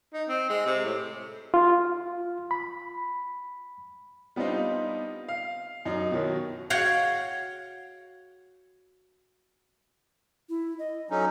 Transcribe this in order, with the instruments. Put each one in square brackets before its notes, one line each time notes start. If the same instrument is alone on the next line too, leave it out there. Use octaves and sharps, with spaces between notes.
[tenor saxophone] D#4
C4
G#3
C3
A2
[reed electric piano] F4
B5
[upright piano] G3 B3 C4 D4 D#4 F4
F5
F#2 D#4
B2 D#3 F#3 E4
[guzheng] F#4 C#5 F5 G5
[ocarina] E4
D#5
[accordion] F#3 C#4 D#4 [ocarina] A4